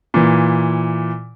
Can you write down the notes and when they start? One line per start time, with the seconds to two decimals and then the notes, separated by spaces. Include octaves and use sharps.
0.14 A#2 E3